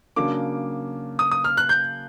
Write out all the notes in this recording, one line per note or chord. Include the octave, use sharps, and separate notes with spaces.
C#3 F#3 A#3 D4 D6
D#6
D#6
F6
F#6
G6